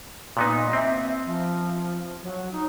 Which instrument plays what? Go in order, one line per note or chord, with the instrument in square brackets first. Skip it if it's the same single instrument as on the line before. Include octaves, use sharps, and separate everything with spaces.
[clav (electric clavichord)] A#2 B3 D#4
[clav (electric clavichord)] C4 [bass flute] E5
[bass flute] F3
F#3
D#4